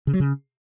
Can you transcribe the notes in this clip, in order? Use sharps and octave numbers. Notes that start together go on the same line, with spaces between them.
C#3
F#3
C#3